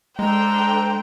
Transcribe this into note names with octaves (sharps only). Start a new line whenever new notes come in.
G#3 D4 A4 C5 G5 A#5